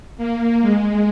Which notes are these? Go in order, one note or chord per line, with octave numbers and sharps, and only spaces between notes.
A#3
G#3